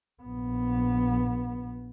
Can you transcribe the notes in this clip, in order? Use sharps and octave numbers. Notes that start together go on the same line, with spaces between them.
A#1 B3